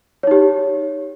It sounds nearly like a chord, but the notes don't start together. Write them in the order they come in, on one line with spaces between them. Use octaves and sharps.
C#5 D#4 G4